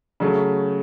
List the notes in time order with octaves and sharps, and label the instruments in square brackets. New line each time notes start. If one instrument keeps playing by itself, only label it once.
[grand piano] C#3 F#3 A3